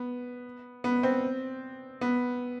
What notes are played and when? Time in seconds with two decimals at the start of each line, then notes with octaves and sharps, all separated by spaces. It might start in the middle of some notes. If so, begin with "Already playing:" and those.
Already playing: B3
0.84 B3
1.03 C4
2.01 B3